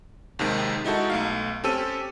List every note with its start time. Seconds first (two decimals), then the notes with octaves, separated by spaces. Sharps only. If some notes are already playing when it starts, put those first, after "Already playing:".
0.39 D#2 C3 D#3 G#3
0.85 G#3 D#4 E4 F#4 A4
1.10 B1 A3 F5
1.64 C4 C#4 G4 A4 E6 D#7